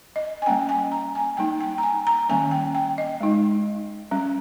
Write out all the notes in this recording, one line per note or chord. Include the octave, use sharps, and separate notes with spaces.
D#5
G#5
G3 A#3 C#4 G5
G#5
A#5
G#5
G3 A#3 D#4 G5
G5
A#5
G#5
A#5
D#3 G3 A#3 C#4 G#5
G5
G5
D#5
G#3 D#4
G3 C#4